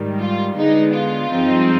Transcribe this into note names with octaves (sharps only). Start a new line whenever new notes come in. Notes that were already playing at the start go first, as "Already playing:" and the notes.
Already playing: G#2 D#3 G3
F4
D3 G#3 B3 D#4
F4
G2 F3 G#3 C4 D#4